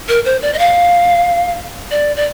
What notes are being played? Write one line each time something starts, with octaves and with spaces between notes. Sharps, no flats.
A#4
C5
D5
D#5
F5
D5
D5